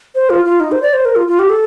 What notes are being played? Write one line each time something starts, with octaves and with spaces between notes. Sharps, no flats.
C5
F4
F4
D#4
C5
D5
C5
A#4
F4
F4
G4
A4